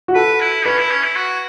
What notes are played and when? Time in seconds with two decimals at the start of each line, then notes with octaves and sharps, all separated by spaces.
0.08 F#4
0.15 A4 B4
0.40 E4
0.65 C#4 B4
0.78 E4
0.91 C#4
1.03 E4
1.16 F#4